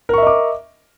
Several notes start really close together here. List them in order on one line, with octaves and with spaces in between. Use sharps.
A#4 C#6 E5 D#5 D6